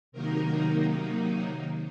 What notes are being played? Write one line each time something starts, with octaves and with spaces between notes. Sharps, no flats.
C3 D#3 F#3 A#3 D#4 A#4